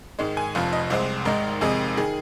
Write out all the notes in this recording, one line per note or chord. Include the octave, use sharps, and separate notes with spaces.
G#2 D#3 G#3
G#5
F1 F2 F3 F5
D#5
C2 C3 G#3 C4 C5
G#1 G#2 D#3 G#3 D#4 A#4
F2 C3 D#3 G#3 D#4 G#4
D#3 G#4